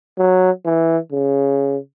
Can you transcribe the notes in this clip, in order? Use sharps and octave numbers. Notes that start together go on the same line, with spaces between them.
F#3
E3
C#3